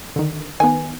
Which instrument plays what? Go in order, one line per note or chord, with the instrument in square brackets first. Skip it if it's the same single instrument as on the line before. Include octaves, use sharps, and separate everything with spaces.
[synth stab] D3 D#3
[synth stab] D#3 B3 [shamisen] G#5